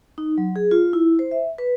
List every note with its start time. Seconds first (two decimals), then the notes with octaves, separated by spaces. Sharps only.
0.18 D#4
0.38 F#3
0.56 G#4
0.71 F4
0.93 E4
1.19 C5
1.31 E5
1.58 B4